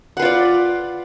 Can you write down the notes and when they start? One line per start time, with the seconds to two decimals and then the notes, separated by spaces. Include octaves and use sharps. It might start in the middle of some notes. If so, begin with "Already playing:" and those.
0.17 F#5
0.19 B4
0.22 F4
0.25 D5